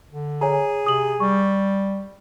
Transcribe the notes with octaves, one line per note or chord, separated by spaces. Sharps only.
D3
G#4 C#5 G#5 A#5
C3 D#6 F#7
G3 C#6